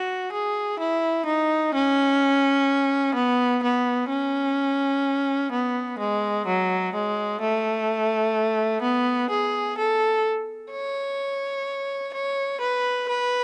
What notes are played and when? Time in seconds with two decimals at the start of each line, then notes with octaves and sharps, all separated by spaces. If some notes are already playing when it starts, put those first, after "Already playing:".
Already playing: F#4
0.32 G#4
0.79 E4
1.26 D#4
1.74 C#4
3.15 B3
3.63 B3
4.09 C#4
5.52 B3
5.99 G#3
6.47 F#3
6.94 G#3
7.41 A3
8.82 B3
9.30 G#4
9.78 A4
10.71 C#5
12.14 C#5
12.61 B4
13.09 B4